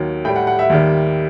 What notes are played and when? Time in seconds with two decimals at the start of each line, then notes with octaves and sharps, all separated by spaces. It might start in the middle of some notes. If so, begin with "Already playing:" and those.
Already playing: D#2 D#3 F#3
0.25 A2 G5
0.28 G3
0.36 F#5
0.47 F#5
0.59 E5
0.70 D#2 D#3 G3